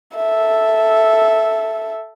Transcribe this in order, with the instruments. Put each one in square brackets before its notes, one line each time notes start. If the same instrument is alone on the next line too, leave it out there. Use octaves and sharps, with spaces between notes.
[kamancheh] A4 E5